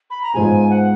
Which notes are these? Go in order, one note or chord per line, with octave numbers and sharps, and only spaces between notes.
B5
A#5
G#2 F3 G#3 B3 G#5
F#5